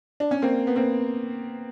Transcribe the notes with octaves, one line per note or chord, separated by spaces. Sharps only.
D4
C#4
A#3 C4
B3
A#3 C4